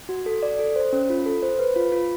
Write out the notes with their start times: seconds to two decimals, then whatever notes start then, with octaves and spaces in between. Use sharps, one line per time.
0.09 F#4
0.26 A4
0.43 D5
0.59 A4
0.76 C5
0.93 C#4
1.10 F4
1.26 A4
1.43 C5
1.59 B4
1.76 F4
1.92 F4